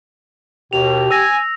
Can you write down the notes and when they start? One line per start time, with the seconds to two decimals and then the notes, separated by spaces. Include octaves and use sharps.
0.73 D#2 B2 G4 F7
1.11 G#5 E6 A#6